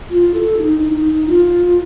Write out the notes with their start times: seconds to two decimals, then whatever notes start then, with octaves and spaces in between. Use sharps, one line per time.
0.10 F4
0.34 A4
0.57 D#4
0.80 D#4
0.95 D#4
1.27 F4